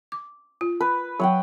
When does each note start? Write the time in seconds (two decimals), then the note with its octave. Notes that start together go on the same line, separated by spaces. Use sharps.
0.12 D6
0.61 F4
0.80 B4
1.20 F#3 C#5 F#5 G5